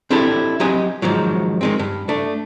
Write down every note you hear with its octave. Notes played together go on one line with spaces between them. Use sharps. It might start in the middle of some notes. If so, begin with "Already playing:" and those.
C4 D4 E4 G4 A4
F#3 C4 G4 D#5 G#5
G#2 D#3 F3 F#3
D#3 G#3 C4
G2
A3 D4